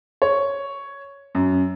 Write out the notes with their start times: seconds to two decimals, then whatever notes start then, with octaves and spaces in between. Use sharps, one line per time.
0.22 C#5
1.35 F#2